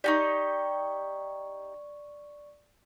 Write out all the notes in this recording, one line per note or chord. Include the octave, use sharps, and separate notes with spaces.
D#4 F#4 G4 D5 C#6